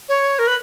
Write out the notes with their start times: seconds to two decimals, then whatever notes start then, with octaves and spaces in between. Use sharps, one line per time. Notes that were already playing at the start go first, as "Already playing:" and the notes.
0.09 C#5
0.39 A#4
0.47 B4